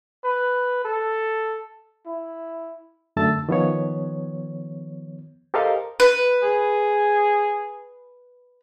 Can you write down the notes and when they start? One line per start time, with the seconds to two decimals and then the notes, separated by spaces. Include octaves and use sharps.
0.24 B4
0.85 A4
2.06 E4
3.17 F#2 D3 A3 A5 E6 A6
3.49 D#3 F3 B3 C#5
5.54 G4 A4 A#4 C5 D#5 F5
6.00 B4
6.43 G#4